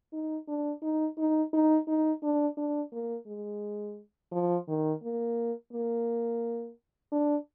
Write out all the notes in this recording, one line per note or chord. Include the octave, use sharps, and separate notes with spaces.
D#4
D4
D#4
D#4
D#4
D#4
D4
D4
A#3
G#3
F3
D#3
A#3
A#3
D4